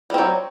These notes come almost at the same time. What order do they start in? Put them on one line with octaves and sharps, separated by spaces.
G3 C4 F#3